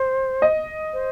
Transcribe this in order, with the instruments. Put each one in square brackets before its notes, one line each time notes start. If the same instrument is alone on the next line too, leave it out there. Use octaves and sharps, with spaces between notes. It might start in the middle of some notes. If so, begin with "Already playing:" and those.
Already playing: [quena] C5
[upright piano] D#5
[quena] C5